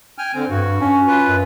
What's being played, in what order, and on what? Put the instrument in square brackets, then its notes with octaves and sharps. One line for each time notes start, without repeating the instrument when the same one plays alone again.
[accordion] G5 G#5 F6
D3 C4
[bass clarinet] G2 [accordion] F#4
[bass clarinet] C#4
[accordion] F4 B4
[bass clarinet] F#2